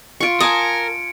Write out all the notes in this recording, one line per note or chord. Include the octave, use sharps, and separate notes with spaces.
F4 C#6 C#7 D7
A#4 G#5 A5 D#6